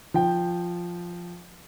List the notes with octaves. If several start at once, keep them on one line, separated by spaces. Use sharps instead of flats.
F3 G5